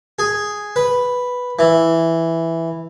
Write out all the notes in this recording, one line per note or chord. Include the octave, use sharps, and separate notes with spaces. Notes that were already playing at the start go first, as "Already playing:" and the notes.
G#4
B4
E3